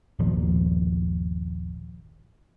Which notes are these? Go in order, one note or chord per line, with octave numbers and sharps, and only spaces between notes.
G1 D#2 A#2 F3